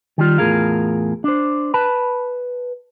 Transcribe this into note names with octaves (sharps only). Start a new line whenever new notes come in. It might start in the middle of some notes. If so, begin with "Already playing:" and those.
D#3 G3 F4
E2 A2 F4 G#4 A#4 F5
D4 C5
B4 A5 B5